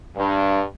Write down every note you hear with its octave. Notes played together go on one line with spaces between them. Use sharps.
G2